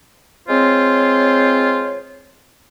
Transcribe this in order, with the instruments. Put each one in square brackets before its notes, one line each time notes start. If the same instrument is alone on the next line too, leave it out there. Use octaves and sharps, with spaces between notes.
[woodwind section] G#3 C4 F4 C5 C#5